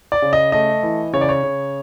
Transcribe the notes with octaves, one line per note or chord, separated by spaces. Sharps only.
D5
C#3
D#5
A3 D#5
E3
C#3 C#5
D5
C#5
C#3